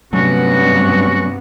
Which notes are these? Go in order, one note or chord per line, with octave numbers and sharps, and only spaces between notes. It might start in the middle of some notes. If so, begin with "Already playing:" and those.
G2 C3 F#3 A3 B3 C#4 F#4